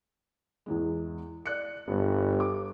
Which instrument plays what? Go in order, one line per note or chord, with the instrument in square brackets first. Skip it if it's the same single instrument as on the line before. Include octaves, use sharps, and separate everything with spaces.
[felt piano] E2 E3 G#3
D5 F#6 C#7
[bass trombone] G1 [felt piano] G2
[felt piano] D6